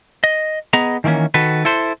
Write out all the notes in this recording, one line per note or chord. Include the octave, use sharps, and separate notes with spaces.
D#5
B3 G#4 D#5 A#5
D#3 E3 A3 A#3 C#4
D#3 F#4 A4 B4
E4 A4 C5